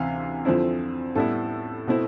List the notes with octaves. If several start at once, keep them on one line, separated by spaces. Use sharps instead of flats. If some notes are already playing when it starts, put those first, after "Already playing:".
Already playing: D2 C3 E3 F5
F2 D3 F3 C4 E4
A2 G3 B3 E4 A4
B2 A3 C4 E4